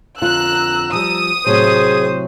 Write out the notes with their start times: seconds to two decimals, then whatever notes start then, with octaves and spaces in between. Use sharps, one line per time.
0.22 F2 D3 F4 A#5 E6 F#6
0.93 F3 G3 D#6
1.46 A2 C3 F#3 G#4 C5